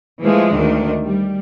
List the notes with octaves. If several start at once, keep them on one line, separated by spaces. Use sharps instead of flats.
E3 F3 G#3 A3
D2 D#3 D4
G3